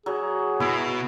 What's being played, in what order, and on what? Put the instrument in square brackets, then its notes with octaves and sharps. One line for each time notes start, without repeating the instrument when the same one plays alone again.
[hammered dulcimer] F#3 [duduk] G#4
[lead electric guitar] B2 B3 [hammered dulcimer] E4